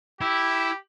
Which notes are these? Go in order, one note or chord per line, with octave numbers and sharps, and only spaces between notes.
E4 G4